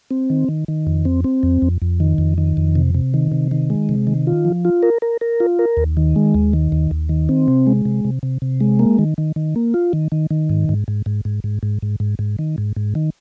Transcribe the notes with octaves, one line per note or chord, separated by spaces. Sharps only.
C4
D#3
D#3
D#3
F2
C4
C4
F2
F2
F2
D#3
F2
D#3
F2
C3
C3
D#3
C3
D#3
G#3
C3
D#3
F4
F3
F4
A#4
A#4
A#4
F4
A#4
D#2
D#3
G#3
D#2
D#3
D#2
D#2
D#3
C4
C3
G#3
C3
C3
C3
C3
G#3
A#3
D#3
D#3
D#3
A#3
F4
D#3
D#3
D#3
G#2
G#2
G#2
G#2
G#2
G#2
G#2
G#2
G#2
G#2
D#3
G#2
G#2
D#3